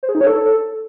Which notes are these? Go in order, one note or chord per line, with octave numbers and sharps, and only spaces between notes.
C5
G#4
D#4
C#5
A4